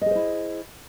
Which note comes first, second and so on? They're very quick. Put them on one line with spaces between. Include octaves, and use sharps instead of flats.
D#5 G#4 C5 E4